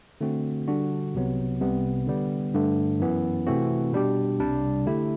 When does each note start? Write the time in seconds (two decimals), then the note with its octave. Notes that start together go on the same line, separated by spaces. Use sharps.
0.21 D3 A3 C4 F#4
0.68 D3 G3 D4 F#4
1.14 C2 C3 F#3 B3
1.61 C2 C3 G3 B3
2.07 D3 G3 B3
2.54 G2 D3 A3
3.00 F#2 E3 B3
3.46 C3 E3 A3 C4 F#4
3.93 B2 G3 D4 G4
4.39 C2 C3 G3 D4
4.86 D3 A3 E4 G4